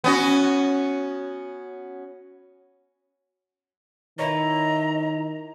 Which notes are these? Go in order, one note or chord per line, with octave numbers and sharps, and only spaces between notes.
B3 C#4 F#4
D#3 E4 B4 C#5 D#5 A#5